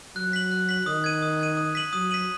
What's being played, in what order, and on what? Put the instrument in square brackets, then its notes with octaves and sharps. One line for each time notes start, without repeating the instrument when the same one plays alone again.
[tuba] F#3 [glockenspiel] F#6
[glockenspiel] B6 F#7
F#6
B6 F#7
[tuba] D#3 [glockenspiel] D#6
[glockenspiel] G#6 D#7
D#6
G#6 D#7
D#6
B6 D#7 F#7
[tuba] F#3 [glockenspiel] D#6
[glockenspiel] B6 D#7 F#7